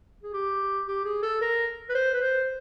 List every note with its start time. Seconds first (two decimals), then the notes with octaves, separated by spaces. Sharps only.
0.23 G#4
0.33 G4
0.88 G4
1.05 G#4
1.23 A4
1.41 A#4
1.89 B4
1.95 C5
2.13 B4
2.21 C5